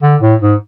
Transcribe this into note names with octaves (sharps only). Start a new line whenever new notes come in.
D3
A2
G#2